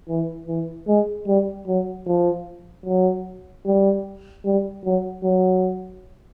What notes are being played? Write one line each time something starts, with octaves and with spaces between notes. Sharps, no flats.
E3
E3
G#3
G3
F#3
F3
F#3
G3
G3
F#3
F#3